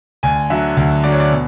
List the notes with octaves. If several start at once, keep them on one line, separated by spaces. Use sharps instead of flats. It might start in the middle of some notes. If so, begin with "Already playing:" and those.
D2 G#5
D3 F#3 E5
D2
D3 F#3 D5
C#5
D5
B2